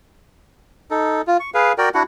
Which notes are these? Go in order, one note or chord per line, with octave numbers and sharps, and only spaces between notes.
D#4 A4
F4
C#6
G#4 B4 F5
F#4 A#4 D5 G5
D4 E4 F#4 F#5